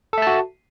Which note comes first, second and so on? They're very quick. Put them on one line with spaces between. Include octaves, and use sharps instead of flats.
A4 E5 A5 F#4